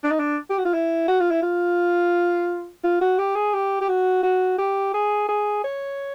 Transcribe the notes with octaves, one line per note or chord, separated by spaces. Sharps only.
D4
D#4
D4
G4
F#4
F4
E4
F#4
F4
E4
F4
F4
F#4
G4
G#4
G4
G4
F#4
F#4
G4
G#4
G#4
C#5